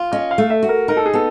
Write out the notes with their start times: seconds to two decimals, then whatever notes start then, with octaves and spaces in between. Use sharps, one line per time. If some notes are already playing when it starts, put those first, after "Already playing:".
Already playing: F4
0.12 C#4 D#5
0.31 F5
0.38 A3
0.50 E5
0.63 F#4
0.69 A#4
0.88 D#4 A#4
0.97 A4
1.06 G#4
1.13 B3 A4